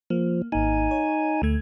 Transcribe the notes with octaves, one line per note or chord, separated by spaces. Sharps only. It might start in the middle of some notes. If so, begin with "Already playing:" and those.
F3 A#3
G#1 A#3 D#4 G#5
C#5
D2 A3 G#6